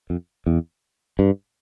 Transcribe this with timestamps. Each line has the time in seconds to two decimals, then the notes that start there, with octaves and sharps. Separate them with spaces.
0.10 F2
0.46 E2
1.19 G2